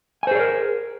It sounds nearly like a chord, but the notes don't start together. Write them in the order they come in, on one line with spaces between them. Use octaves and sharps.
G#5 C5 G#4 C#5 A#4